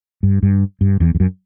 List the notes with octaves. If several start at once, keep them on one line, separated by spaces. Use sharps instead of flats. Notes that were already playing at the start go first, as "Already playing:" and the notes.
G2
G2
G2
E2
E2
F#2